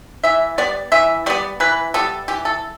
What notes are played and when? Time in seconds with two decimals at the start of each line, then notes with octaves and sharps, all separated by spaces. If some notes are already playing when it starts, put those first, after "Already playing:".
0.23 E3 E5
0.58 G3 B3 D5
0.92 E3 E5
1.26 G3 B3 D5
1.60 E3 B4
1.94 G3 B3 A4
2.28 E3 G4
2.45 A4